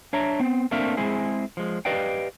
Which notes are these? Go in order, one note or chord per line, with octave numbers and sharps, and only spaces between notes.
D4 C#5 E5 A#5
B3 C4
A3 A#3 C4 D4 E5 F5
G#3 C4 E4 G#4
F3 G#3
G4 B4 D5 D#5 F5 G5